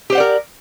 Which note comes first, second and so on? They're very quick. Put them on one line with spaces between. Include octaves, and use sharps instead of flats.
G4 C5 F#5 D5 A#4